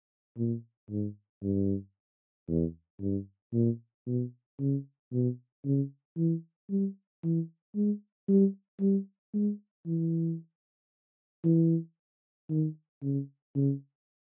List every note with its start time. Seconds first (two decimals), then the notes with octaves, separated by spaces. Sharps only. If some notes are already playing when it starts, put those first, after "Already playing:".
0.38 A#2
0.90 G#2
1.43 G2
2.48 E2
3.01 G2
3.53 A#2
4.07 B2
4.59 C#3
5.12 B2
5.65 C#3
6.18 E3
6.70 G3
7.23 E3
7.76 G#3
8.29 G3
8.81 G3
9.34 G#3
9.87 E3
11.44 E3
12.50 D#3
13.03 C#3
13.56 C#3